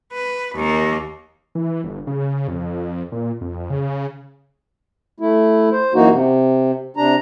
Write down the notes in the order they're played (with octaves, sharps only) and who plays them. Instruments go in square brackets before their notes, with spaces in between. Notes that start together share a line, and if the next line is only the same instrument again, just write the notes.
[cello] B4
D#2 A#3
[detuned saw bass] E3
G1
C#3
F2
A#2
F2
C#3
[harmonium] A3 E4
C5
F#2 E3 A#3 D#4 F#4
C3
C3 D4 A#5